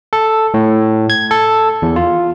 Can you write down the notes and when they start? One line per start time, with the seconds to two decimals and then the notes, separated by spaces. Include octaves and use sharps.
0.13 A4
0.54 A2
1.10 G#6
1.31 A4
1.82 E2
1.96 F4